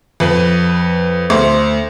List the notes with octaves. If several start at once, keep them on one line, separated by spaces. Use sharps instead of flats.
F2 B4
D2 C5